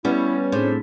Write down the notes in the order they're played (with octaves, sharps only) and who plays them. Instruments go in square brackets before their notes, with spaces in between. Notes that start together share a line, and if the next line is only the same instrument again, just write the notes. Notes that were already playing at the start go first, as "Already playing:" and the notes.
[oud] G3 B3 [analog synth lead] C#4 [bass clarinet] E4
[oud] A2 [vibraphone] C4 D4 G#4 [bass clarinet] C5